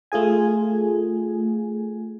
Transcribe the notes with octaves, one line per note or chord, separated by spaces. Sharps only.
A3 F4 G#4 G#5